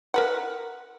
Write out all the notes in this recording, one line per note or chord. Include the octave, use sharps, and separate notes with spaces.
A#4 B4 F#5